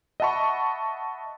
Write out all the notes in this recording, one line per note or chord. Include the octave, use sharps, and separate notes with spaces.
D#5 E5 F#5 A5 B5 C#6